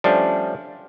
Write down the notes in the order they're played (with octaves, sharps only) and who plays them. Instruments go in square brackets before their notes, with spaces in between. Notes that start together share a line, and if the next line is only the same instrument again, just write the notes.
[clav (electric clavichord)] F3 G3 A3 C#4 D4